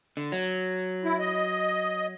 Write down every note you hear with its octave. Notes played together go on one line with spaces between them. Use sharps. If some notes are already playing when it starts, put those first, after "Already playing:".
D3
F#3
E4
D#5